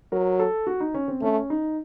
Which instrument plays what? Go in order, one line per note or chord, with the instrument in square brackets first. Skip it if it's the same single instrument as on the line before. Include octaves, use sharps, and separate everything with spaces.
[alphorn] F#3 [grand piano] A#4
[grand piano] A4
F#4
D#4
C#4
C4
[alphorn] A3 [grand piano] C#4
[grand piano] D#4